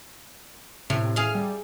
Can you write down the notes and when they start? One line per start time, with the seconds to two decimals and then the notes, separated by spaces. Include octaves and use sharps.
0.90 A2 C3
1.16 G#4 F5 F6
1.35 G3